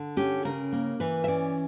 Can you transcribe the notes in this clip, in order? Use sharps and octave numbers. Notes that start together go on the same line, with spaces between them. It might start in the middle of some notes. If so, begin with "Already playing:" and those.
Already playing: D3
C#4 G4
C#3 A#4
A#3
E3 B4
E5
C#4 D5